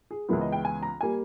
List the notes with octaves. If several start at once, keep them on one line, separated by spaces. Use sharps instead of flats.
G#4
C#2 C#3 E3 G#3 B3 A#4
D#5
G5
G#5
A#5
G3 A#3 G#5